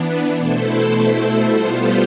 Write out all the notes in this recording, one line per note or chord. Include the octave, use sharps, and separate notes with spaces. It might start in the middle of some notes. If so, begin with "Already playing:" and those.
Already playing: E3 B3 D4
B2 A3 E4 A4 C5
G3 B3 F4 C5